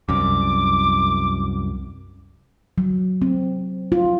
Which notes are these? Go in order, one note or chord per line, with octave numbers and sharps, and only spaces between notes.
C2 F#2 D6
F#3
C4
F4